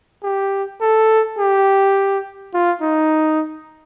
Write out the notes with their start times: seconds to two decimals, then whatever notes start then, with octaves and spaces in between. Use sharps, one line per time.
0.23 G4
0.81 A4
1.38 G4
2.54 F4
2.82 D#4